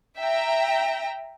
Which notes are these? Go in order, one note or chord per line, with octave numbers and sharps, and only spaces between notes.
E5 G5 A#5